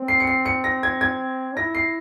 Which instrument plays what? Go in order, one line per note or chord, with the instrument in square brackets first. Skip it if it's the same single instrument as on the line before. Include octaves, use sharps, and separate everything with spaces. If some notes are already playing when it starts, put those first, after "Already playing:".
Already playing: [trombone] C4
[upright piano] C7
C#7
C7
C#7
A#6
G#6
G#6
[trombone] E4 [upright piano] A#6
[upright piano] C7